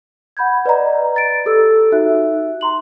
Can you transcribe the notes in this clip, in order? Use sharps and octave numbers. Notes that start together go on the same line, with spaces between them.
F#5 B5 G6 G#6
B4 D5 D#5 A#5
A6 D7
G4 A4 E6
D#4 F#4 E5 F#6
A#5 C6 F#7